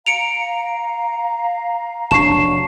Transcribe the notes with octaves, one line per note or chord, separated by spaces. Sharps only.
F5 A#5 C#7 D7 F7
F1 F#3 D4 A5 C#6 C7 E7